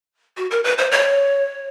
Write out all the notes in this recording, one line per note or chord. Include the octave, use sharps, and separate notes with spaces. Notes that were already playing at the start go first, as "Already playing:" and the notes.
F#4
A#4
B4
C5
C#5